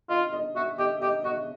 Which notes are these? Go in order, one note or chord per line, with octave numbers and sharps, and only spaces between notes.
F4 D#5
D#5
F#4 E5
G4 D#5
G4 D#5
F#4 D#5